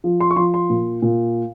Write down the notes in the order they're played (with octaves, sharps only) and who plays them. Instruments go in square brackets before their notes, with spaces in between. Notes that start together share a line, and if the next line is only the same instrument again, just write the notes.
[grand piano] F3
C6
C#6
F3 C6
C6
A#2
A#2